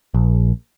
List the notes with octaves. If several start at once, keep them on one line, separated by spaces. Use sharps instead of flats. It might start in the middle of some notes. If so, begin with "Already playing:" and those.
A#1